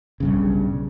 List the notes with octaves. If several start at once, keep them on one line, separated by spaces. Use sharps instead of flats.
B1 G2 C#3